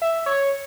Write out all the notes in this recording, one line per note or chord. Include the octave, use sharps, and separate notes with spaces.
E5
C#5